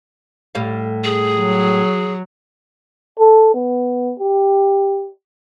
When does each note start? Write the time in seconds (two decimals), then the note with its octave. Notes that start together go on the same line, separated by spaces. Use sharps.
0.55 A2 G3 F5
1.04 G#4
1.39 F#3
3.19 A4
3.54 B3
4.19 G4